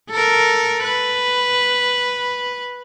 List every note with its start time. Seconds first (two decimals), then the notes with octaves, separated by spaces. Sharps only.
0.10 A4 A#4
0.84 B4